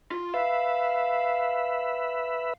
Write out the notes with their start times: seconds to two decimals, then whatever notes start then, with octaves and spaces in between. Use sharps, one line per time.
0.11 F4
0.34 B4 E5 F5